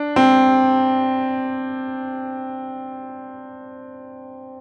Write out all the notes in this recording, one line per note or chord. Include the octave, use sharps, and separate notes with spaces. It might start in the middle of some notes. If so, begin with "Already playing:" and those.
Already playing: D4
C4